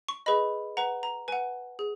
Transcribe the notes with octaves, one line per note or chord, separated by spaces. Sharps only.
C#6
G#4 B4 D#5 B5
B4 F#5 A#5
A#5
B4 F#5 G#5
G#4